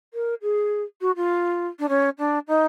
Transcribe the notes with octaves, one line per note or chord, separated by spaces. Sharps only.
A#4
G#4
F#4
F4
D4
C#4
D4
D#4